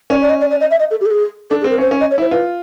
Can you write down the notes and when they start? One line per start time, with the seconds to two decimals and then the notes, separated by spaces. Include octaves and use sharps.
0.10 C#4 D5
0.21 D5
0.30 D#5
0.41 D5
0.51 D5
0.61 D#5
0.71 E5
0.80 D#5
0.91 A4
1.01 G4
1.06 A4
1.11 G#4
1.50 D4 A4
1.61 G#4
1.64 C4
1.71 A#4
1.78 C#4 C5
1.91 C#4
2.01 D#5
2.11 C#5
2.18 E4 C5
2.31 F4 B4